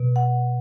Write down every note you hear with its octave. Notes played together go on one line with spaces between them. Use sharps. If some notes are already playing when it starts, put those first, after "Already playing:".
Already playing: B2
F#5